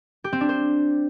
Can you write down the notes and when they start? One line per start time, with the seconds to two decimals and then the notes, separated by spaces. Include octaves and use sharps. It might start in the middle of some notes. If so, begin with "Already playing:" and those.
0.24 G4
0.33 C4
0.41 D4
0.49 C5